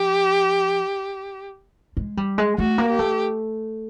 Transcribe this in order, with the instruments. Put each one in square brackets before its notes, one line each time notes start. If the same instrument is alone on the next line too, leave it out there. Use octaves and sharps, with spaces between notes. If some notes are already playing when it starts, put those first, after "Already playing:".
Already playing: [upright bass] F3 [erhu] G4
[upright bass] G#3
G3
G#3
[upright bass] A3 [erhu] F#4
[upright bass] A#3
[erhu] G4
[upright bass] A3